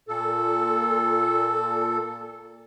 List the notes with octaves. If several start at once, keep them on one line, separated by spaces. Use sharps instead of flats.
A#2 A4